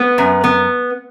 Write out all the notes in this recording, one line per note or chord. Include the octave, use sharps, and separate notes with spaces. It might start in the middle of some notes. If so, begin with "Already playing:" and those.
Already playing: B3
F#2
B3